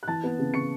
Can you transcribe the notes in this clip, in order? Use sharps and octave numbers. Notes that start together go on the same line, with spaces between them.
F#6
E3 A5 A6
B3
C#3
C#3 C#6 C#7